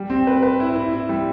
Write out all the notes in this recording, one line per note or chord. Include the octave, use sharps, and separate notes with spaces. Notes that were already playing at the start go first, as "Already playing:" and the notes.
Already playing: G3
C4
B4
B4
E4
E4
E4
G3